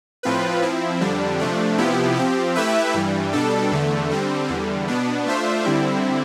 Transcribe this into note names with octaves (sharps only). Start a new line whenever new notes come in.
A2 F3 C4 F4 B4
F3 C4 E4
F2 D3 G3 D4
C3 F3 A3 D4
C3 F3 B3 E4 G4
F3 C4 G4
A3 E4 G4 B4 E5
G2 E3 G3
B2 G3 D4 A4
E2 D3 A3
D3 G3 C4
E2 D3 G3
B2 B3 D4
A3 D4 F4 C5 E5
D3 G3 C4 E4